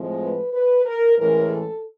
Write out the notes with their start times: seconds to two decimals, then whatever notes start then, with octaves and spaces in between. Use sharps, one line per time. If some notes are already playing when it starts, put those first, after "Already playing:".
Already playing: A2 F3 G#3 C4
0.23 B4
0.54 B4
0.85 A#4
1.17 A2 E3 G#3 C#4 A#4
1.49 A4